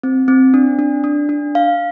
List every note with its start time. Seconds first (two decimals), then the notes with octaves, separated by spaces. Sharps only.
0.03 C4
0.28 C4
0.54 D4
0.79 D4
1.04 D4
1.29 D4
1.55 F5